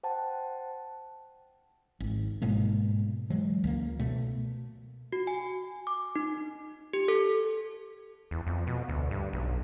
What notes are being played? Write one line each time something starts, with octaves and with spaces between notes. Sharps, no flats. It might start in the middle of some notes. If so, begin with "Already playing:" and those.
C5 F#5 G5 A5
G#1
G#2 B2 G#3 A#3
E3 F#3 G#3
C#2 A3 A#3
B2 A3
F#4
G#5
D6
D#4
G4
A4
E2
F2
B2
D2
G2
B1